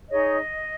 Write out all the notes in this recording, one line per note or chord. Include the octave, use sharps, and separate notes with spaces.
D#4 G#4 C#5 D#5